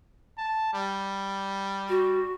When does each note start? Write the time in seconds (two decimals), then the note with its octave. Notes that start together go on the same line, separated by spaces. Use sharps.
0.38 A5
0.73 G3
1.89 F#4